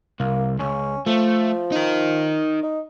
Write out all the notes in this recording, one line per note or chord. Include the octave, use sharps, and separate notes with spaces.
C2 A#3
C#2 C#4
F3 A3
D#4 A#4
D#4